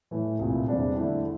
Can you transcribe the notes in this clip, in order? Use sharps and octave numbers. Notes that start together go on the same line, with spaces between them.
A2 E3 A3
C2 A#2 A3
E2 C3 G3 D4
D3 A3 E4